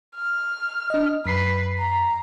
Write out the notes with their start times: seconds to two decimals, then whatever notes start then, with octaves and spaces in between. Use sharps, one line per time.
0.16 F6
0.90 D4 D#5
1.26 F#2 B4 B6 C7
1.79 A#5